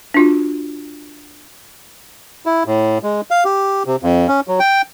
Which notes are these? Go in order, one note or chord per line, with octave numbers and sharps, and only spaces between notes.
D4 F4 F#4
E4
A2
G#3
F5
G4
C3
F2
C#4
F#3
G5